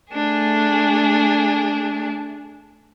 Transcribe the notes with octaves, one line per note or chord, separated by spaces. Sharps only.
A3 D4 G#4